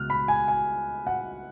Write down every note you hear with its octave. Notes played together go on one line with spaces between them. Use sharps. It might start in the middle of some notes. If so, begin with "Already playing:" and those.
Already playing: C#2 B2 G#3 F6 F#6
B5
G#5
G#5
F#5